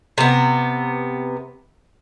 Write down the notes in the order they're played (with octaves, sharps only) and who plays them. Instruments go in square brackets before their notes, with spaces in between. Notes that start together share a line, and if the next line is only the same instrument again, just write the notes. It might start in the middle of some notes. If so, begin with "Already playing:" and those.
[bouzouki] C3 B3